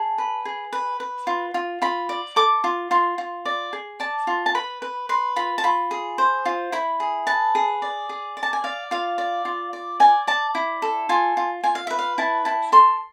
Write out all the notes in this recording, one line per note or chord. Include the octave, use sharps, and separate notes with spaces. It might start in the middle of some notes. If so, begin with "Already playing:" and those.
Already playing: G#4 A5
B4
G#4
B4
B4
F4
F4
F4 B5
D5
A4 D6
F4
F4 C6
F4
D5
G#4
D5 A5
F4
A5
B4 B5
B4
B4 C6
F4 B5
A5
F4 B5
G#4
C5
F4
E4 B5
G#4
B4 A5
G#4
D5
G#4
D5
A5
G#5
D5 F5
F4 F5
D5
F4
D5
D5 G#5
D5 A5
E4
A4
F4 G#5
F4
F4 G#5
F5
B4 E5
F5
E4 A5
E4 A5
A4 C6